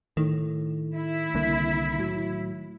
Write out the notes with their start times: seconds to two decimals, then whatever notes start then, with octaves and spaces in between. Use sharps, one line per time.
0.17 A2 D#3
0.94 E4
1.35 C2 D3 A#3
1.98 A2 F#3